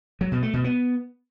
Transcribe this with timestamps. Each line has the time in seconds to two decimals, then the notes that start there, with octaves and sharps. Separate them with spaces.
0.21 F#3
0.32 B2
0.43 A3
0.53 B2
0.64 B3